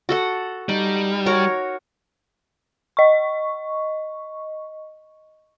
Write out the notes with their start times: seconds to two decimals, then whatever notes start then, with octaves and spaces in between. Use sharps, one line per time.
0.09 F#4 A4 F#5
0.69 G3 D#4
1.26 F#4 A#4 C#5
2.97 D#5 C#6